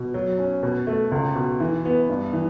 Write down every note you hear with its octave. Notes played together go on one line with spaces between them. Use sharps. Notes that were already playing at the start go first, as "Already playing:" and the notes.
Already playing: B2
F#3
C#4
B2
A3
C#2
B2
E3
B3
G2
E3